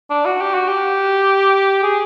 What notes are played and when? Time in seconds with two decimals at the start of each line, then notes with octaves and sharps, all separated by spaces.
0.10 D4
0.25 F#4
0.41 G4
0.54 F#4
0.68 G4
1.83 G#4